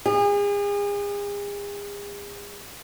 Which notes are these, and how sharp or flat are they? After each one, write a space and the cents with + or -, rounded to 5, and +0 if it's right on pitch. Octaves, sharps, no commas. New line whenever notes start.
G#4 -40